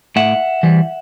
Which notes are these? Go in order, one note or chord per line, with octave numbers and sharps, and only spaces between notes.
A2 E5 F#5
E3 G3